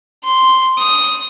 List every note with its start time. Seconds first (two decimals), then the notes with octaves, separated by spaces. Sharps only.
0.24 C6
0.78 D#6